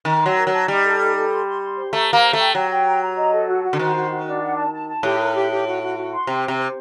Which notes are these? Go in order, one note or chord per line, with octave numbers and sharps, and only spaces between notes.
D#3 A#4
F#3 C6
A#4
F#3
A5
G3 D#4
A4
D#4
A4
C6
C6
C6
C5
A3 A#5
C5
A#3
A#5
A3
G5
F#3 G5
G5
A#5
A#5
D#5
A4
F#4
F#4
D3
D#3 C5
F#4
F#4
D4
F#5
A5
A5
A5
A2 G4
A#4
G4
G4
F#4
F#4
F#4
C6
C3 G5
C6
C3
C5